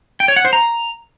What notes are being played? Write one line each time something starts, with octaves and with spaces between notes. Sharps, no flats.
G5
C#5
F#5
C5
A#5